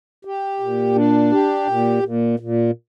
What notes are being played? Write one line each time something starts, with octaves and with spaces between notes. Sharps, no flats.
G4
A#2
D4
G4
A#2
A#2
A#2